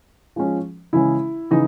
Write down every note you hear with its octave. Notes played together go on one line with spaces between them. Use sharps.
F3 G#3 C#4
C#3 E3 G#3 C#4 E4
C#3 E3 D#4